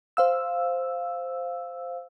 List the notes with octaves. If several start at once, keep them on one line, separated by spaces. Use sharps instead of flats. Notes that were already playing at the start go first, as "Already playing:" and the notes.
C5 F5 E6